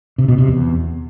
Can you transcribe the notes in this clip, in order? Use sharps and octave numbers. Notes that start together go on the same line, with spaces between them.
C3
B2
C3
E2